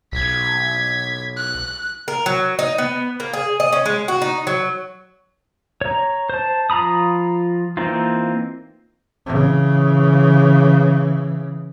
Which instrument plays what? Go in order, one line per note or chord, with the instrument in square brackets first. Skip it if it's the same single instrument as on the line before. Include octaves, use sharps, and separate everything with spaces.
[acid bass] B1 [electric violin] G#6 B6
[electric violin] F#6
[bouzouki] A#4
F#3
D#4
B3
A#3
G#4
D#5
C#4
G#3
F#4
D#4
F#3
[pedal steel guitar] C#5 A#5
C5 A5
F3 F4 A#5 B5 D#6
E3 A#3 C4 D#4 F4
[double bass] C#3 E3